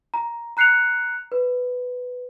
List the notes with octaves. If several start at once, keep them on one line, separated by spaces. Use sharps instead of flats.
A#5
A#5 F#6 C7 C#7 F7
B4